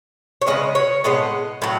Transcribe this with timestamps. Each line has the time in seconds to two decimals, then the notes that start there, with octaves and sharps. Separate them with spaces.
0.42 C#5
0.47 C#3 E3 G#3 B3 D#5
0.75 C#5
1.04 A2 G#3 B3 D#5
1.62 A2 F#3